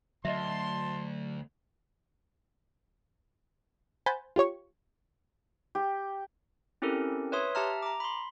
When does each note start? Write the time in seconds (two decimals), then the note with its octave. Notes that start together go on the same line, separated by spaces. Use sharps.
0.25 D2 F#3 D#5 E5 A5 C6
4.06 C5 F#5 G#5 B5 G6 A6
4.36 F4 G4 C#5 C#6
5.75 G4
6.82 C4 C#4 E4 G4 A4 A#4
7.32 B4 C#5 E5 C6 D#6
7.55 G4 E5 A5 A#5 F6
7.82 A#5 D6
8.00 B5 C6